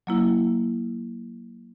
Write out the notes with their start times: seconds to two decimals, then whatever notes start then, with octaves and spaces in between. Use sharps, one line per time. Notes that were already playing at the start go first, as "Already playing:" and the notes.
0.07 F#3 A#3 E4